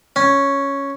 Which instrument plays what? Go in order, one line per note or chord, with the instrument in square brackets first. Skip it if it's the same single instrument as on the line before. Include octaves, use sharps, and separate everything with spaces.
[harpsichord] C#4